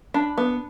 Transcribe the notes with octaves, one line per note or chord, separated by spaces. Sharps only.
D4 B5
B3